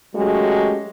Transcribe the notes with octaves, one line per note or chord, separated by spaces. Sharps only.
F#3 G#3 A3 C#4 F#4 G4